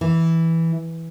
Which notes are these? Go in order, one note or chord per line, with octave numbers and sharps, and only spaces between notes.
E3